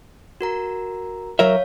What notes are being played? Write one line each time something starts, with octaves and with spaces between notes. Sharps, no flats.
F#4 A#4 A#5
F#3 A#4 C#5 E5 F5